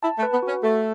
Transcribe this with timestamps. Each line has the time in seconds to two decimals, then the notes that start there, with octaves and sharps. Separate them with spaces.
0.03 E4 A5
0.18 A3
0.23 B4
0.33 B3
0.43 F#4
0.48 C#4
0.63 A3 A4